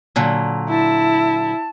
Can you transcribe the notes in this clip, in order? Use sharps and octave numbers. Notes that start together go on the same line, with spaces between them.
A#2 D3 F#3
E4 A5